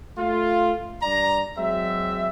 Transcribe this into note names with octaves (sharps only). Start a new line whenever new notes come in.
A3 F4
G2 D5 A#5
F#3 G#3 C4 E5